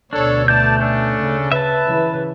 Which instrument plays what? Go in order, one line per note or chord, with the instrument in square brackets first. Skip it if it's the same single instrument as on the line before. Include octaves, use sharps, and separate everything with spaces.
[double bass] D2 B2 [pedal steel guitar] D4 [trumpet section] A4 C#5
[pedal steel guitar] A3 G6 [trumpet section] D4 D5 A5
[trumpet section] C#4 D4 A4
[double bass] C#3
[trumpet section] B4 [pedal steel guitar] E5 A5
[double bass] C#3 E3